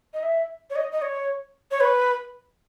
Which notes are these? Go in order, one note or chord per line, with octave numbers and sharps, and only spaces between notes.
D#5
E5
C#5
D#5
D#5
C#5
C#5
B4